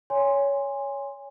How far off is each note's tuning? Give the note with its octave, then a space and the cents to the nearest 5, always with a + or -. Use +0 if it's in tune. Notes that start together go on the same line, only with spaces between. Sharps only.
C#5 +15 G#5 -20 C6 +0